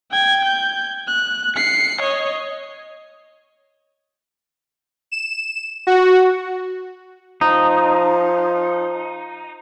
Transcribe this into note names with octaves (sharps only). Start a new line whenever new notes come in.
G5 G#6
G6
F#6
C7 C#7
C#5 D#5
E7
F#4
F3 D#4